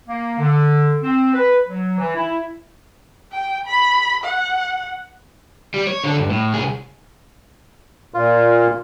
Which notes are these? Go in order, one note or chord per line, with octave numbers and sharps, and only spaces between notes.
A#3
D3
C4
B4
F#3
E3
E4
G5
B5
F#5
G3
C#5
D3 A4
D2 G2
A2
C2 G#4
A#2 F4